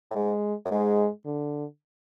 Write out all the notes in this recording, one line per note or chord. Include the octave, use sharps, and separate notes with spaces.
A2
G#2 G#3
F#2
G#2 G#3
D3